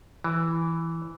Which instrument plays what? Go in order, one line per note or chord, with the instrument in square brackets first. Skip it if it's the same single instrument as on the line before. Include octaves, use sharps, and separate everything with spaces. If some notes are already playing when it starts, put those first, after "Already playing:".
[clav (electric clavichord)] E3